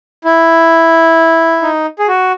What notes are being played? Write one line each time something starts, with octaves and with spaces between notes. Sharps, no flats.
E4
D#4
G#4
F#4